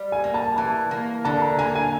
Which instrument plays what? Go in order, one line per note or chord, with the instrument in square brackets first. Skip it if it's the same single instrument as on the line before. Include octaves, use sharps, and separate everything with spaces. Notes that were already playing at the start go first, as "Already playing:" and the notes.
Already playing: [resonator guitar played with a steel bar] G3
[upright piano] G#5
[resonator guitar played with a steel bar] A#3
[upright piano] A5
[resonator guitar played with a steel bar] E3 [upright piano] A5
[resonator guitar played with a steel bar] A#3
[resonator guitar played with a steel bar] D3 [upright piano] A5
[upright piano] A#5
[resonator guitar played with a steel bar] A#3 [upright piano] G#5
[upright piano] G#5